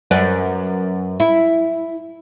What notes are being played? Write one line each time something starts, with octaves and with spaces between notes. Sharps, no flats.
F#2 B4 D5
E4